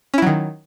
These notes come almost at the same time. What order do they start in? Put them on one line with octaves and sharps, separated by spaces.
C#4 E4 F#3 D#3